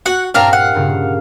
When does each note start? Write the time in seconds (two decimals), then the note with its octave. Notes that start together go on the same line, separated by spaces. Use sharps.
0.06 F#4 F#5
0.35 G2 A#2 C4 D4 A#4 F5 A#5
0.53 F#5
0.75 G2 A#2 C#3